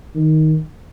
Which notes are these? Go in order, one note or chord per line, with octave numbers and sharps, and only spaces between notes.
D#3